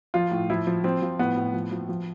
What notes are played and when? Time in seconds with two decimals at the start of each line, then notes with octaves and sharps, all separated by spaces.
0.14 F3 F4
0.31 A2
0.50 F3 E4
0.67 F3
0.84 F3 C4
1.02 F3
1.19 A2 B3
1.37 A2
1.54 F3
1.72 F3
1.89 F3